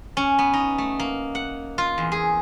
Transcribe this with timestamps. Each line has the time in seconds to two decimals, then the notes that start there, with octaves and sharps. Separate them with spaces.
0.17 C#4
0.39 B3
0.54 D#4
0.78 A3
1.00 A#3
1.35 F#5
1.78 F4
1.98 E2
2.12 G#4